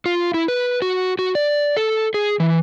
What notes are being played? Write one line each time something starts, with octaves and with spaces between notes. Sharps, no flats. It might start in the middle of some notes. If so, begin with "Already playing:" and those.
F4
E4
B4
F#4
F#4
D5
A4
G#4
E3